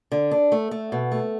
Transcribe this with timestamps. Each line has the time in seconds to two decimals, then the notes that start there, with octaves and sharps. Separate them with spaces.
0.12 D3
0.31 D4
0.52 A3
0.71 A3
0.92 B2
1.12 A3